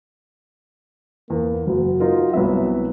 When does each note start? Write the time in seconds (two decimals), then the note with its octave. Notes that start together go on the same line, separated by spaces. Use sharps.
1.30 E2 A#3
1.67 F#1 F#4
2.00 D#4 F4 A#4
2.33 C2 F#3 B3 E5